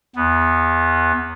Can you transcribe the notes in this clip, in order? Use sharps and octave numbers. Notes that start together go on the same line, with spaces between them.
E2 B3